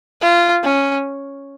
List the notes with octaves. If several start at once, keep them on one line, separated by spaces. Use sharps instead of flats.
F4
C#4